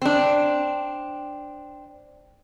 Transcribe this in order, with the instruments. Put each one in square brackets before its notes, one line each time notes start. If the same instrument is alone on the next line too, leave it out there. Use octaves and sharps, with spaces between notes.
[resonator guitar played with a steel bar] C4 D4